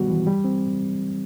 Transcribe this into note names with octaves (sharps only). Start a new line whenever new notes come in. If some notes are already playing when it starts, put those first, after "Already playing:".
Already playing: D#3 G3 B3 F#4
E3
G3
C4